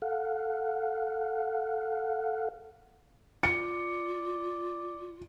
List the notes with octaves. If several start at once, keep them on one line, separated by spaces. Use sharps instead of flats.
A4 F5 F#5
F4 D5 C#7